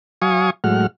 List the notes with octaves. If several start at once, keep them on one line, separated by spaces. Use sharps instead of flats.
F#3 F5 G#5 C#6 D#6
A2 F#3 G#3 F#5 F6